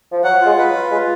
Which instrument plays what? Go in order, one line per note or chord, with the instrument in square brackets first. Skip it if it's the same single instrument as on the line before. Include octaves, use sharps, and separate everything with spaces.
[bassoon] F3
[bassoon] F#3 [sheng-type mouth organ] F#5
[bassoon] G#3 [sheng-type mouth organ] F4
[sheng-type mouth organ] B4
[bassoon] F#3
[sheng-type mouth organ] F4
[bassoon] G#3 [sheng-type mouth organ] F4